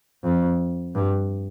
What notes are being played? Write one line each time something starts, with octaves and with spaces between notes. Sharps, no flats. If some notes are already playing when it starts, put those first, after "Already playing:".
F2
G2